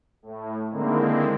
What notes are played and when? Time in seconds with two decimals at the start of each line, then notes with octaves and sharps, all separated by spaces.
0.22 A2
0.70 D3 D#3 G#3 A#3 C4 E4